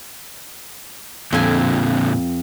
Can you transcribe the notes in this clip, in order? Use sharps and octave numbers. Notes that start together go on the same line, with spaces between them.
F2 A#2 D3 G#5